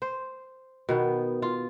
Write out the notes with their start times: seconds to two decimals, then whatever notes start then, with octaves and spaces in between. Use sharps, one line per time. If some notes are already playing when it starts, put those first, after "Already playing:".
0.02 C5
0.89 B2 D#3 B3
1.42 F4